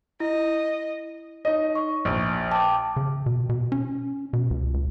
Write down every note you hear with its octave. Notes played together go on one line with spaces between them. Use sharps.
E4 D#5
D#4 C#5 D#5
C#6
A#1
G5 A5 D6
C#3
B2
B2
C#4
B2
C#2
C#2